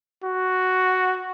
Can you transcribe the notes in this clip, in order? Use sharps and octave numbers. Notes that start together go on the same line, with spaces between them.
F#4